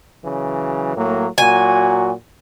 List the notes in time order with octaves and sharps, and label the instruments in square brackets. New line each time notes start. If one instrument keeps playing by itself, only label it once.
[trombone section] C#3 E3 F#3
A2 F#3 A#3
[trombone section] A#2 F#3 F#4 [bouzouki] G#5